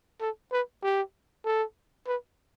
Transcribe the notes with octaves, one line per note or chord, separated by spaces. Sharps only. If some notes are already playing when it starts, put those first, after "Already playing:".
A4
B4
G4
A4
B4